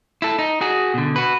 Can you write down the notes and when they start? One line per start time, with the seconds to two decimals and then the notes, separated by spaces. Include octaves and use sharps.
0.22 E4 A4
0.39 D#4
0.61 F#4 G#4
0.94 B2 D3
1.16 F#4 B4